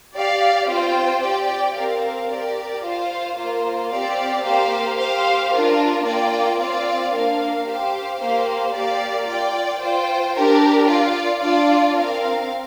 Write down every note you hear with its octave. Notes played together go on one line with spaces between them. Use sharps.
G4 D5 F5
C4 F4 C5 G5
G4 D5 G5
C4 A#4 F5
G4 A#4 D5
F4 C5 F5
A#3 F4 C5
C4 G4 D5 F5
A#3 G4 C5 F5
G4 C5 F5
D4 F4 A#4
A#3 F4 D5 G5
C4 F4 D5 F5
A#3 D4 A#4 F5
G4 C5 F5
A#3 G4 C5 F5
A#3 G4 D5 F5
F4 D5 G5
F4 C5 G5
D4 G4 A#4
F4 D5 F5
D4 F4 D5 F5
C4 A#4 F5